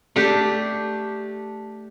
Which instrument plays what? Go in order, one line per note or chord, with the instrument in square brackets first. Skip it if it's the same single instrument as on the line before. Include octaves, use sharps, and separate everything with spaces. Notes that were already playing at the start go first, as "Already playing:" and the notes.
[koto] A3 D4 G4